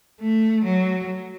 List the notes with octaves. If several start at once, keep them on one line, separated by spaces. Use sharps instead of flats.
A3
F#3